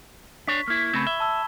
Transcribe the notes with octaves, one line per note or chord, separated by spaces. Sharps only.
D4 C#5 C#6 B6
A#3 E4
C#3 A3 C4 B5 G#6 E7
E5 G7
A5 E6 G7